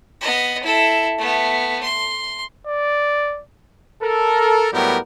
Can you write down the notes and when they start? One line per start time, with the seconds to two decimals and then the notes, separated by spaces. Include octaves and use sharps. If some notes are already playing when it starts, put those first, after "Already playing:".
0.21 B3 D#5
0.63 E4 A4
1.18 A3 B3
1.82 C6
2.67 D5
4.02 A4 A#4
4.72 A2 F#3 G3 B3 G4 A#4